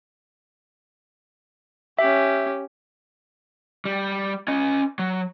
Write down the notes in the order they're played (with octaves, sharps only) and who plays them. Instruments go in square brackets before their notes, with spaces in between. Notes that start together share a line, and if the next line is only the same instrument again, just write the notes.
[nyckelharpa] C#4 G4 [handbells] E5
[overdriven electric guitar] G3
C#4 D#5
F#3